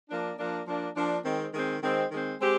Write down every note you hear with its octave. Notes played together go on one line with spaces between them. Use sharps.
F3 A#3 D4
F3 A#3 D4
F3 A#3 D4
F3 A#3 D4
D#3 G#3 C4
D#3 G#3 C4
D#3 G#3 C4
D#3 G#3 C4
G#3 C4 G4